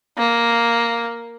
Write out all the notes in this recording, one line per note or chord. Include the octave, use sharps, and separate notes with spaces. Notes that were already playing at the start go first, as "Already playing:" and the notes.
A#3